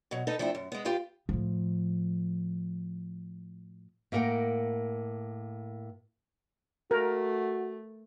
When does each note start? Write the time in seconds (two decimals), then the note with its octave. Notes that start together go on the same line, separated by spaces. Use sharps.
0.11 B2 F#3
0.27 D#4 A4 B4
0.39 F3 A3 C4 D4 E4
0.55 F#2
0.72 G#3 B3
0.85 F4 G4 B4 F5
1.29 A2 F3
4.12 A2 A#3 A#4 D#5 F#5 G5
6.91 A3 F#4 A#4